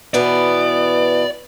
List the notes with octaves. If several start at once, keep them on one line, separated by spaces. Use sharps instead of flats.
B2 E3 B3 D5